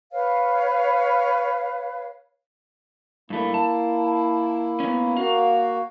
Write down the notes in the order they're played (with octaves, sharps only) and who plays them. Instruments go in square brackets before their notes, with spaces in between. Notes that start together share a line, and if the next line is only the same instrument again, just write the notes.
[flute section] B4 C#5 F5
[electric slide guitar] G2 A3 [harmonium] A#3 E4
[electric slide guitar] A5
B3 C#4
[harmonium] A#3 F#4 [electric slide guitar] F5